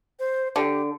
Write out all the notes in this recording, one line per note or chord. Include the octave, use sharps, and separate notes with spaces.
C5
D3 G4